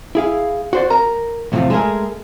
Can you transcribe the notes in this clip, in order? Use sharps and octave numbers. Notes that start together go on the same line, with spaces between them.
E4 G#4 F5
F#4 C5 D5
A#4 A#5
E2 A2 C3 E3 F3
G#3 A3 D4 G#4 A#4